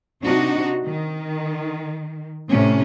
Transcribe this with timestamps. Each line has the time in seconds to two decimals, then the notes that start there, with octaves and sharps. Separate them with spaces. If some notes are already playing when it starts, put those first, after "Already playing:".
0.23 C3 D4 D#4 F#4
0.84 D#3
2.49 A2 C3 A3 C#4